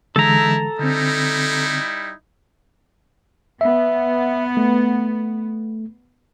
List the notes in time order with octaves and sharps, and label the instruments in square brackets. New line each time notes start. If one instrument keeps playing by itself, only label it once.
[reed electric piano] D3 E3 G#3 [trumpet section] D#4 E4 [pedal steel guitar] A4 A#5
[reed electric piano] D3 C4 [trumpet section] G3 D#4 E4
[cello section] B3 [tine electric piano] E5
[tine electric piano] A3